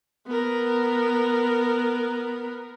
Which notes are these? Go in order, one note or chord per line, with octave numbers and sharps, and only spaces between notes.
B3 A#4